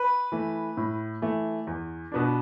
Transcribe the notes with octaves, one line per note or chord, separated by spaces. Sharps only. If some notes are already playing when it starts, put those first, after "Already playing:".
Already playing: B4
E3 A3
A2
E3 A3
E2
B2 B3 D4